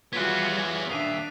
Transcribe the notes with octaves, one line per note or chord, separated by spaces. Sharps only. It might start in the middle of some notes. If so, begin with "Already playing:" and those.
G3 B3 F4 F#4 G#4 C#5 F#6 B6
D#2 D4 E5 D#6 C7 D#7